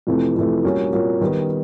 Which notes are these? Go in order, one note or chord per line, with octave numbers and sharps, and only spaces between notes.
F2 C3 E3 A3
F2 C3 E3 A3
A#2 G3 A#3 C#4 F#4
A#2 G3 A#3 C#4 F#4
D#3 G3 B3